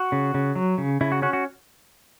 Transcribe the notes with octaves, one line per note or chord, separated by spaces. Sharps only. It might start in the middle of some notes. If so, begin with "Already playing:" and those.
Already playing: F#4
C#3
C#3
F#3
C#3
C#3 E4
F#4
C#4 F#4
F#4